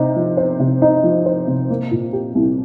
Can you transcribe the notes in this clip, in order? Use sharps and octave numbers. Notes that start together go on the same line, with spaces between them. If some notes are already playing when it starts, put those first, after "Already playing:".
Already playing: C3 D#4 C5
F3
C5
C3
D#4
F3
C5
C3
A#3
A#2
G4
C2